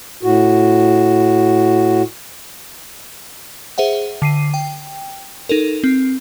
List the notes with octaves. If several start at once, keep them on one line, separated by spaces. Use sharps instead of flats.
A2 F#4
G#4 C5 E5 F#5
D3 C7 D#7
G5
D#4 A4 A#4
C4